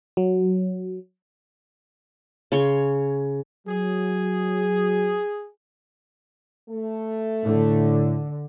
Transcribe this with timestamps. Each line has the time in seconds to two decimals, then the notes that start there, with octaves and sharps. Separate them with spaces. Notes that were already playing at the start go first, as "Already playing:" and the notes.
0.17 F#3
2.52 C#3 C#5 C6
3.67 F#3 G#4
6.68 A3
7.45 A2 D3